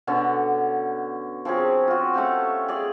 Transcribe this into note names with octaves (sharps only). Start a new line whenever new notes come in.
B2 D3 C#4 F#5
F3 C4 C#4 G#4
F4 F#4
A3 C#4 G4 F5
G#4 D5 F5